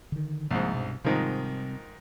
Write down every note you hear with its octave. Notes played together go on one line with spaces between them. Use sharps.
D3 D#3
C2 G#2 F3 A#3
G2 B2
G#2 C3 D#3 F3 G3 C4